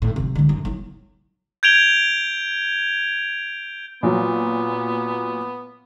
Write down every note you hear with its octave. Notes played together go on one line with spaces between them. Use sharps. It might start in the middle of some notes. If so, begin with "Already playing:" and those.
A2
C3 F3
C#2 D3
F#2
F#3 E4
G6 G#6 D7 F7 G7
A#2 F#3 B3